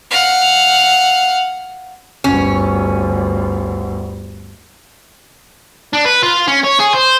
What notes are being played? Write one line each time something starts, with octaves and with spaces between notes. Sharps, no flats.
F5 F#5
G1 D2 C#4
D4
B4
F4
C#4
C#5
G#4
C5